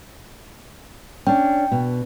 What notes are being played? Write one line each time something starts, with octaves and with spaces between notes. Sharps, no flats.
C#4 D4 G5
B2